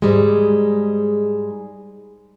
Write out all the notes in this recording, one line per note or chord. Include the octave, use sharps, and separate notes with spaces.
G#2 G3 G#3